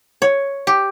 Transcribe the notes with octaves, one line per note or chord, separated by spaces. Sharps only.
C#5
G4